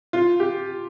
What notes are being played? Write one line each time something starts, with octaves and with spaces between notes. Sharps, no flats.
F4
G4